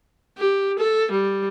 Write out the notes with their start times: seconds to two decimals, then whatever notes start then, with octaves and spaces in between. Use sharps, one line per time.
0.38 G4
0.79 A4
1.11 G3